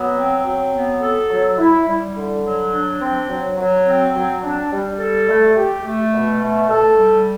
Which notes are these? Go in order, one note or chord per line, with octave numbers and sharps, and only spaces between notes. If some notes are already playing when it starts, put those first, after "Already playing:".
Already playing: F#3 B3
C4
F#3
B3
A4
F#3
E4
G3
D3
F#3
D4
C4
F#3
F#3
C4
F#3
D4
G3
A4
A3
G4
A3
B2
A3
A4
G3